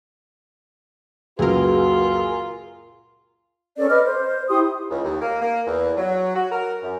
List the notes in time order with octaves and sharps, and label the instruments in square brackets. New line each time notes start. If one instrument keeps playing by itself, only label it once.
[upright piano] C#2 F#2 A#2 [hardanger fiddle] F4 [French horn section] F#4 B4 [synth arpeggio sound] G#4 A#4
[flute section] C#4 A4 A#4 D5
B4 D#5 D6 F6
C5
E4 G4 C6 D#6
[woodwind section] C#2
D#2
A#3
A#3
E2
F#3
F#4
A#4
F#2